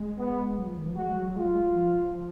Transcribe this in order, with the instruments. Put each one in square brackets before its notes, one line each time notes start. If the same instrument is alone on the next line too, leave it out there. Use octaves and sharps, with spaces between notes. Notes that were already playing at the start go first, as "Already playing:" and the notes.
Already playing: [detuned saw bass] G#3
[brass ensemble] B3
[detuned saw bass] F#3
F3
D#3
F3
[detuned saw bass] G#3 [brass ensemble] F#4
[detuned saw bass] F3
F#3
[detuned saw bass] G#3 [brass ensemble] F4
[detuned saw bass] F#3
G#3
F#3
F3